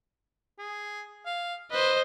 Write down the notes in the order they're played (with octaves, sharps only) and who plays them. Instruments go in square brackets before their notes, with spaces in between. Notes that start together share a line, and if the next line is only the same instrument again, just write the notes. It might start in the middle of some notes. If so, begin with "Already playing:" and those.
[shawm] G#4
F5
[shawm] B4 [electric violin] C5 D#5